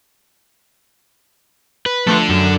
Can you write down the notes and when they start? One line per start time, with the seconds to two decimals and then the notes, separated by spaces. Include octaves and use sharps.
1.86 B4
2.07 F3 A3 D4 F4 A4
2.30 F#2